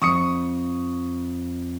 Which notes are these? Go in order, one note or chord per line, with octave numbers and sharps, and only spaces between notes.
F2 C#6 D#6 C#7